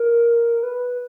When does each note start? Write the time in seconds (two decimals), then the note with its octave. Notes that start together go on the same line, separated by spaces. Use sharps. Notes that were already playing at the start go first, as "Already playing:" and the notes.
Already playing: A#4
0.63 B4